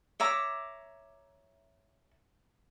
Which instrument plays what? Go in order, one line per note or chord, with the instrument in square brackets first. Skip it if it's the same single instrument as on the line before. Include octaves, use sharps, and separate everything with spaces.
[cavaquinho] C#5 E5 A#5 D6